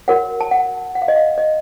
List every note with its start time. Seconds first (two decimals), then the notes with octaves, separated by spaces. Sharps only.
0.08 F#4 A#4 C#5 F#5
0.41 A5
0.51 F#5
0.95 F#5
1.02 F5
1.08 D#5
1.16 F5
1.38 D#5